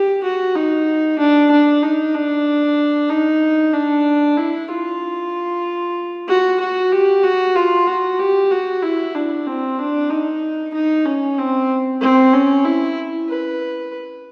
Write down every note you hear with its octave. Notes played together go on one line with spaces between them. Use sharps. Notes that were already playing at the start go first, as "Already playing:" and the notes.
Already playing: G4
F#4
D#4
D4
D4
D#4
D4
D#4
D4
E4
F4
F#4
F#4
G4
F#4
F4
F#4
G4
F#4
E4
D4
C4
D4
D#4
D#4
C#4
C4
C4
C#4
E4
B4